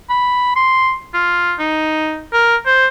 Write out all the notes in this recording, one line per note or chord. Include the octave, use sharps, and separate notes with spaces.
B5
C6
F4
D#4
A#4
C5